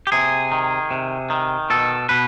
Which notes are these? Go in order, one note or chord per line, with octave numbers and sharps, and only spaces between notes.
G4
C3 G#4
D#3
C3
D#3
B2 A4
B2 B4